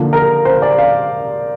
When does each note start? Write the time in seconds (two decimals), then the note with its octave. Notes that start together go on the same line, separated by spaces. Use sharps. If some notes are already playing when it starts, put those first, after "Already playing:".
Already playing: D3 F3 A#3
0.13 A#4
0.45 C5
0.62 D5
0.78 F5